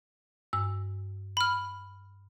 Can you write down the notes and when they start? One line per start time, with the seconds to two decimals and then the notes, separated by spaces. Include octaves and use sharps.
0.53 G2 E6
1.37 B5 F6